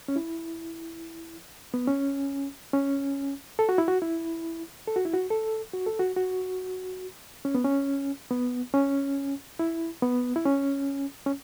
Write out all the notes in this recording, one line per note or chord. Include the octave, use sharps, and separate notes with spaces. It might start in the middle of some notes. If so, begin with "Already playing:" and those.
C#4
E4
B3
C#4
C#4
A4
F#4
E4
F#4
E4
A4
F#4
E4
F#4
A4
F#4
A4
F#4
F#4
C#4
B3
C#4
B3
C#4
E4
B3
E4
C#4
C#4